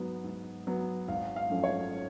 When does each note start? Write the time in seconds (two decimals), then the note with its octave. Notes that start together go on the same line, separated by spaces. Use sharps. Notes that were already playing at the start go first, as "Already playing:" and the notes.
Already playing: G#2 F#3 B3
0.24 G#2
0.67 F#3 B3
1.08 G#1 F5
1.36 F5
1.50 F#2 F3 A3 C#4
1.64 C#5